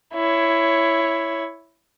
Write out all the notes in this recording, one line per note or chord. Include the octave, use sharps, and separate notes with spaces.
E4 C#5